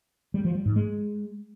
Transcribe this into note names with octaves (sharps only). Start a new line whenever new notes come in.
G3
F3
G3
G#2
G#3